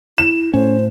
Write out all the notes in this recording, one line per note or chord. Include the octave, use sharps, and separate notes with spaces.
E4 E7
A2 C#4 C5